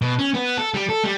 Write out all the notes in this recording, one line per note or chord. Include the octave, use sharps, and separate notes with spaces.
B2
C#4
B3
A4
G3
A4
G3